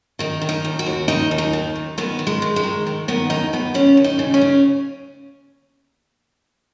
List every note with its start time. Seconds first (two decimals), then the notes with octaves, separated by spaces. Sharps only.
0.19 D#3 D#4
0.42 D#3
0.49 D#4
0.65 D#2
0.79 F#4
0.86 D#2
1.08 D#3 D#4
1.31 D#2
1.38 D#4
1.53 D#3
1.76 D#2
1.98 D#3 B3
2.19 D#3
2.27 G#3
2.42 D#3
2.56 G#3
2.63 D#3
2.87 D#3
3.08 D#3 B3
3.30 D#2 D#4
3.53 D#2 B3
3.74 C#3 C#4
3.97 D#2
4.04 D#4
4.19 C#3
4.34 C#4
4.41 C#3